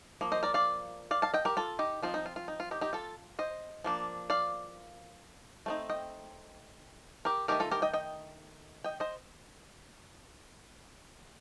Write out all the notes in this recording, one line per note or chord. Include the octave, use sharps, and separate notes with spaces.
F3 A#3
C5 D#5
A#4 D5
D5 F5
D5 F5
F5 A5
D#5 G5
G4 A#4
F4 A4
D#4 G4
F3 C4 D#4 F4
D#4
F4
F4
D#4
F4
D#4 G4
D#4 G4
F4 A4
C5 D#5
F3 A#3 D4
D5 F5
A3 C4 D#4
D#5 G5
G4 A#4
D#3 A3 D#4 G4 A#4
F4 A4
G4 A#4
D#5 G5
D#5 G5
D#5 G5
C5 D#5